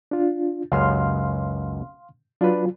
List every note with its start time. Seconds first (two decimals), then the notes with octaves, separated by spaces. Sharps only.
0.11 D4 F4
0.72 C#2 F#2 F#3 F5 C6 F6
2.41 F#3 D4 F4 B4